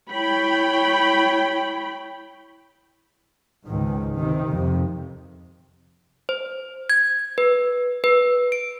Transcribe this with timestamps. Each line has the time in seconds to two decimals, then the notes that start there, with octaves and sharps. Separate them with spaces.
0.11 E4 C#5 G5 B5
3.66 C#2 G#2 D#3
4.17 C3 D#3
4.49 F2 C3
6.29 C5
6.90 G#6
7.38 B4
8.04 B4
8.52 D7